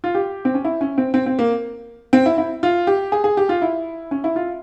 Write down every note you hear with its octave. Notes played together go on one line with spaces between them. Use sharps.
F4
G4
C4
C#4
E4
C#4
C4
C4
C4
A#3
C4
E4
E4
F4
G4
G#4
G#4
G4
F4
E4
C#4
E4
F4